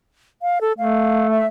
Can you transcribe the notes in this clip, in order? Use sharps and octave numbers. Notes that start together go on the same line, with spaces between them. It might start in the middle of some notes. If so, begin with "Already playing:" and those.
F5
A4
A3 F5
E5